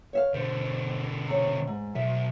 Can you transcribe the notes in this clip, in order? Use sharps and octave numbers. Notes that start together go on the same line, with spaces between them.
C#5 E5 F5
B2 D3 C5
C3 C#5
G#2
B1 E5